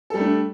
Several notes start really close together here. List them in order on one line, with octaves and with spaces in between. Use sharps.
A4 G3 A3 D4